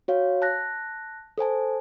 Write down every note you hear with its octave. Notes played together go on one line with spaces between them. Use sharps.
F#4 C#5 F5
A5 F#6 A#6
A4 C5 G#5 A5